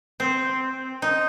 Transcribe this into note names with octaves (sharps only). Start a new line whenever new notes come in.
C4
D#4